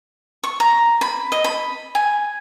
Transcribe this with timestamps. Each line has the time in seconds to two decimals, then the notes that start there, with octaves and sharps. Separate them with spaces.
0.44 C#6
0.60 A#5
1.01 B5
1.32 D#5
1.44 B5
1.95 G#5